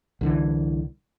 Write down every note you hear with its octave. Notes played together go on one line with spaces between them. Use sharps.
C2 D3 E3